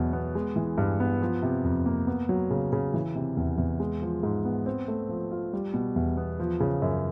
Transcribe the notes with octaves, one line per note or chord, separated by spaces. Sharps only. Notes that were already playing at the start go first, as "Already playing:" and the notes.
Already playing: E2 B2 F#3
B3
G#3
E3
G2
B3
F3
C3
F2
A#3
B3
F#3
C#3
C#3
E3
C3
E2
E2
G#3
F3
G#2
B3
C4
A3
F3
F4
G3
B2
E2
B3
F3
C#3
F#2